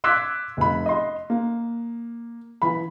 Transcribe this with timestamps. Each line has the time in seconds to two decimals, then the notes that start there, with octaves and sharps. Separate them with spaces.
0.04 C6 D6 E6 F#6 G#6 B6
0.57 F1 B5
0.86 D#5 C6
1.30 A#3
2.62 E3 B5